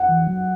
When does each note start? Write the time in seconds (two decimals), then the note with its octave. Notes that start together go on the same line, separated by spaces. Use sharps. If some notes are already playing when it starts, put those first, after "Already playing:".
Already playing: F#5
0.09 E3
0.27 F#3